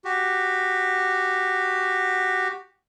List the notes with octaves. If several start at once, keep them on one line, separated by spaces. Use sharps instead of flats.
F#4 G4